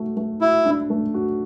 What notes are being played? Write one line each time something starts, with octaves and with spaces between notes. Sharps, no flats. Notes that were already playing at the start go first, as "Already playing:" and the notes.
Already playing: A3 F#4
A3
E4 F#4
D4
A3
F#4